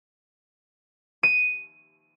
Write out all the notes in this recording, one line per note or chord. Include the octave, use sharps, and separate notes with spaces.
D#7